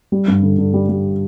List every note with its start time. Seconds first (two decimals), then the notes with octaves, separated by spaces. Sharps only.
0.12 G3
0.28 G2
0.43 D3
0.58 D3
0.74 G3
0.89 G3